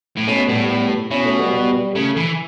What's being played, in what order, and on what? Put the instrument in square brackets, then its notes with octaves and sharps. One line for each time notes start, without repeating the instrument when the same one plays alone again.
[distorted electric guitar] A2
[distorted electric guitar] B2 [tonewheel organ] A3 C#4
[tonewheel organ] A3
[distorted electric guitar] A2 [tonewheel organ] G3 B3
[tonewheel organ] G3 B3
[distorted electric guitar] B2 [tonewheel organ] C#4 E4
[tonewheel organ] A3 C#4
G3 B3
G3 B3
G3
[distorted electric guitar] C#3 [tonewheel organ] A3
[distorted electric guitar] E3